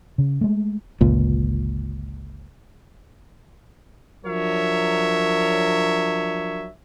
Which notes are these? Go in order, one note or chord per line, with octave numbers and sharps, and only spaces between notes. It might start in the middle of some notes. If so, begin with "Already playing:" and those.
C#3
G#3 A3
G1 C#2 A#2
F3 F#3 D4 A#4 C#5 E5